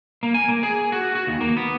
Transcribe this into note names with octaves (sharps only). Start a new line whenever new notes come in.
A#3
G#5
A#3
G#4
F#4
F#4
D#2
A#3
B3